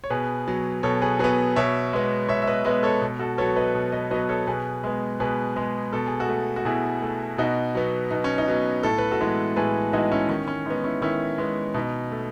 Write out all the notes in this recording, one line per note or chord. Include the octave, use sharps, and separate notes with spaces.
C#5
B2 G#4 B4
F#3 B3
B2 A4 C#5
G#4 B4
F#3 B3 G#4 B4
B2 C#5 E5
G#3 B3
B2 C#5 E5
E5
B4 D#5
G#3 B3 B4 D#5
A4 C#5
B2
F#4 A4
F#3 B3 A4 C#5
B4 D#5
B2
B4 D#5
F#3 B3 B4 D#5
A4 C#5
B2 G#4 B4
G#3 B3
B2 G#4 B4
G#3 B3
B2 A4
G#4
F#4 A4
A3
F#4
B2 E4 G#4
A3
B2 D#4 F#4
F#3 B3
B2 D#4
C#4
D#4
F#3 B3
A2 A4
B4
F#4 A4
E3 G#3 B3
A2 G#4 B4
E3 G#3 B3 D#4 F#4
C#4 E4
D#3 C#4
C#4
G#3 B3 D#4
C#4 E4
D#3 C#4 E4
G#3 B3
B2 D#4
A3